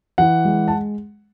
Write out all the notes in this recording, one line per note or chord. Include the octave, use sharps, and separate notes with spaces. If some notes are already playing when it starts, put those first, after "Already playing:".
E3 F#5
G#3
A5